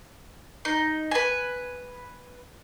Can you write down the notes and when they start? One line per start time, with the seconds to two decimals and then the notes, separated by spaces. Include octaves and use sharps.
0.65 D#4
1.11 B4 G#5